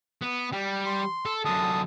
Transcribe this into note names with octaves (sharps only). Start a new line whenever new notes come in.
B3
G3
C6
A4
F#2 D3 A5 D#6